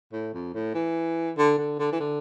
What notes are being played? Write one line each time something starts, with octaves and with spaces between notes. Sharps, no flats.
A2
F2
A2
E3
D3
D3
D3
E3
D3